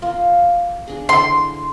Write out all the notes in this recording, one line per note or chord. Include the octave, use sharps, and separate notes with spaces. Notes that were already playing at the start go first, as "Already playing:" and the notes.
A#3 F4
D4 G#4
D3 E3 C6